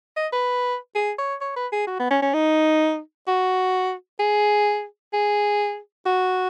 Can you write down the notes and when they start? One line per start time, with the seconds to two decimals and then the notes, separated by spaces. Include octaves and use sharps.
0.16 D#5
0.33 B4
0.95 G#4
1.18 C#5
1.41 C#5
1.56 B4
1.72 G#4
1.87 F#4
1.99 B3
2.10 C#4
2.22 C#4
2.34 D#4
3.27 F#4
4.19 G#4
5.13 G#4
6.06 F#4